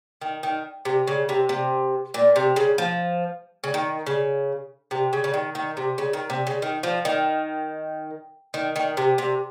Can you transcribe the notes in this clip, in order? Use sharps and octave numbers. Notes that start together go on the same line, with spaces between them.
D#3
D#3
C3
C#3
C3
C3
A#2
C3
C#3
F3
C#3
D#3
C#3
C3
C#3
C#3
D#3
D#3
C3
C#3
D#3
C3
C#3
D#3
F3
D#3
D#3
D#3
C3
C3